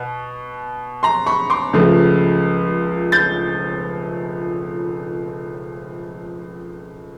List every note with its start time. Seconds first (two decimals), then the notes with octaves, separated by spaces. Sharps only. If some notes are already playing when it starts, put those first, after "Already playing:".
Already playing: B2
1.03 A#5 C6
1.27 B5 C#6
1.50 C6 D6
1.73 C#2 C#3 F3 A3
3.12 G6 A6